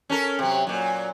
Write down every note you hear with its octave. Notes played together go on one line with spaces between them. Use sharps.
C#4 A4 A#4
C3 F#3
A#2 F#3